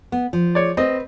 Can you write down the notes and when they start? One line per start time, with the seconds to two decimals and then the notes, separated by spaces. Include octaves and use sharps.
0.12 B3
0.33 F3
0.55 C#5 D5
0.77 C4 B4 D#5